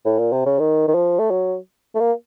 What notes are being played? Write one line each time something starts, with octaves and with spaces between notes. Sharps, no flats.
A2
A#2
C3
C#3
D#3
D#3
F3
A3
F#3
A3
A#3